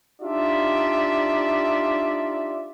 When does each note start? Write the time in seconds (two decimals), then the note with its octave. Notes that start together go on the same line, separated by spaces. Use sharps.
0.22 D4 D#4 F4 G4 D5 E5